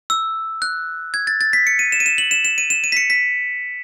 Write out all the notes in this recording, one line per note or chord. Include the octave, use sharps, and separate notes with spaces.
E6
F#6
G#6
A6
A6
B6
C#7
D#7
E7
D#7
E7
F#7
E7
E7
D#7
E7
D#7
B6
C#7
B6